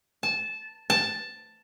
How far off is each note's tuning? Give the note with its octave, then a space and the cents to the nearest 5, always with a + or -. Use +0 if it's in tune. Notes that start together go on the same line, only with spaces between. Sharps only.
A5 -15
A5 +5